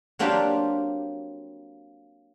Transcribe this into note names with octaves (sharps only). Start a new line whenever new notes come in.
F#3 A#3 C4 D4 F4 G4